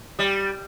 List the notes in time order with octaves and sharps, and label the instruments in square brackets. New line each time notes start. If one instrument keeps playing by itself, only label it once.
[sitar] G3